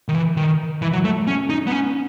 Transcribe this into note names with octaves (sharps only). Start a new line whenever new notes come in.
D#3
E3
D#3
E3
F#3
A3
C#4
D#4
B3
C#4